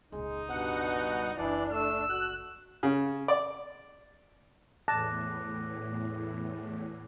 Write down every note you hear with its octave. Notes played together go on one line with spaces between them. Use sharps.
D#1 C#2 G#3 D#4
G2 B2 F#5
F#1 C#2 E3 D4 D5
A3 E6
F#4 F#6
C#3
D5
E2 A2 A5 D6 F#6 A#6